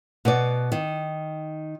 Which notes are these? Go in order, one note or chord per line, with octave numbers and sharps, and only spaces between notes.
B2 B3 D5
D#3